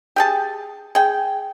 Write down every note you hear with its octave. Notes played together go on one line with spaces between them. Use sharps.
G4 G#4 A5
G#4 G5